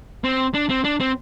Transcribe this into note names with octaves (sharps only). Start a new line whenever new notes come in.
C4
D4
C4
D4
C4